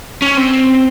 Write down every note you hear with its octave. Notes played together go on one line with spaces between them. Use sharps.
C#4
C4